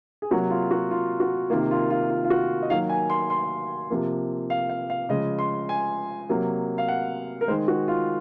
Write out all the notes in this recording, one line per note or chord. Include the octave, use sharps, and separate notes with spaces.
G#4
C3 F#3 A#3 F#4
F4
F#4
F4
F#4
C3 D#3 A#3 F4
F4
F4
F4
F4
F#4
D#5
D#3 F#3 A#3 F5
G#5
C6
C6
C3 F3 A#3
F5
F5
F5
C#3 F3 G#3 D#5
C6
G#5
C3 F#3 A#3
F5
F#5
A#4
D#3 G#3 C5
F#4
F4